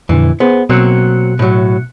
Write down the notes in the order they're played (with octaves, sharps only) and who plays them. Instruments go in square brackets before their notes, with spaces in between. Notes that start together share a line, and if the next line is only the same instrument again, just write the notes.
[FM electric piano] F2 A#2 D3 [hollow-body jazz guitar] E3
[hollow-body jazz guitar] B3 [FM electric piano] G#4 C5
[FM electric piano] B2 F#6 C#7 [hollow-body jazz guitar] F#3 A#3 C4
[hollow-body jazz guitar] A2 F#3